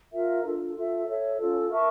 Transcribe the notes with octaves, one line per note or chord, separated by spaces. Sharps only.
F4 A#4 E5
D4 F4 A4
F4 A4 E5
A4 C#5 E5
C#4 F4 A4
A#4 E5 A5 C#6